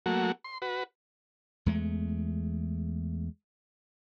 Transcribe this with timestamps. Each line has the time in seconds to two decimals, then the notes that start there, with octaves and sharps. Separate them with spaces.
0.06 F#3 A3 A#3 F#4
0.44 C6
0.62 F#4 B4
1.66 E2 G#3 A3